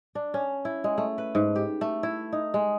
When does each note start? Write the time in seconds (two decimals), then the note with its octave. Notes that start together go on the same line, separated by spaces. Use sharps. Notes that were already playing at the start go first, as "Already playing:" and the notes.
0.15 D4
0.34 C#4
0.65 E4
0.84 G#3
0.98 A3
1.18 B4
1.35 G#2
1.56 G4
1.81 A3
2.03 E4
2.33 D#4
2.54 G#3